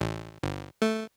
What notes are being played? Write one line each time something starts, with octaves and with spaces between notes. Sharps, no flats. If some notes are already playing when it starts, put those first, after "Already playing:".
A1
G1
A3